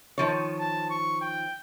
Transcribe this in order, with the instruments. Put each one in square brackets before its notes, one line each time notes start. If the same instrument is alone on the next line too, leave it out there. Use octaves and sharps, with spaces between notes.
[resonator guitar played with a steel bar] D#3 F3 C#5
[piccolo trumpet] A5
C#6
G5